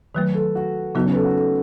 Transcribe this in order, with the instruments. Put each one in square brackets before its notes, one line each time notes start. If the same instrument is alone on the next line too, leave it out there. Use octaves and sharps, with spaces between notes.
[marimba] D#3 F#3 A3 [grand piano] B4
[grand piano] A4
F#4
[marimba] C#3 F#3 B3 F#4 [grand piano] D#4
[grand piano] C#4
B4
A4
F#4
A3